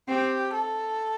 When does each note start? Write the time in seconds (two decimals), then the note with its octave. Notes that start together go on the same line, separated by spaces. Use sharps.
0.09 C4 G4
0.53 A4